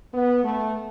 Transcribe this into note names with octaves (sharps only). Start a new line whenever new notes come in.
B3
A3